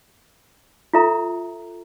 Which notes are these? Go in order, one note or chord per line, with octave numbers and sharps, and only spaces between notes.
F4 A4 E5 A#5